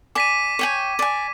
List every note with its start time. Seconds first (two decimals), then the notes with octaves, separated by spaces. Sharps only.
0.15 D5 G#5 D6 B6 D#7
0.59 C#5 G5 G#5
0.99 D5 G#5